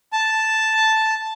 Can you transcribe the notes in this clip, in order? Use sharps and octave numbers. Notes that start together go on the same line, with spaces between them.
A5